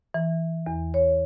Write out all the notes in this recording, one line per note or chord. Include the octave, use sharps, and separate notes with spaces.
E3
E2
C#5